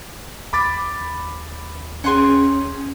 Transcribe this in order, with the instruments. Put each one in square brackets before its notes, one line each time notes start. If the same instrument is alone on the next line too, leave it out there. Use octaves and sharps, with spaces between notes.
[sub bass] D#2 [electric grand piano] B5 D6 A6
[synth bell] C#4 G#4 [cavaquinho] F#5 G5 C6